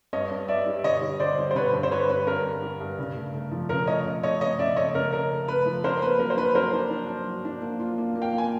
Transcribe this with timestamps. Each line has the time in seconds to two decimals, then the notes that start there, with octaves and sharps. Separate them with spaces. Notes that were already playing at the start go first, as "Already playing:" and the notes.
0.13 G2 C#5 D#5
0.31 G2
0.48 G2 D5 E5
0.66 G3
0.84 D3 C#5 D#5
1.02 G3
1.20 D3 C5 D5
1.38 G3
1.51 C5
1.55 D3 B4 C#5
1.73 G2
1.83 C5
1.91 G3 B4 C#5
2.09 G3 B4
2.27 G2 A#4
2.44 G2
2.62 G3
2.80 G2
2.99 C#3
3.16 A3
3.34 A3
3.51 F3
3.69 C#3 A#4
3.87 A3 C#5 D#5
4.06 C#3
4.23 A3 C#5 D#5
4.41 A3 C#5 D#5
4.59 C#3 D5 E5
4.76 A3 C#5 D#5
4.95 C#3 A#4
5.13 C#3 A#4
5.30 A3
5.48 A3 B4
5.66 F3
5.84 D4 A#4 C5
6.02 A#3 B4
6.19 F#3 A#4
6.30 C5
6.37 D4 B4
6.55 F#3 A#4 C5
6.73 D4
6.90 D4
7.09 D4
7.26 F#3
7.45 D4
7.62 A#3
7.79 F4
7.98 A#3
8.16 A#3
8.22 F5 G5
8.33 A#3
8.38 G#5